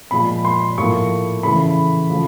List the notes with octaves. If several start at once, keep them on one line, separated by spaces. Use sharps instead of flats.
A#2 F3 G#3 B5
C6
A2 F3 A#3 C#6
C#3 E3 A3 B5
C#3 F3 A3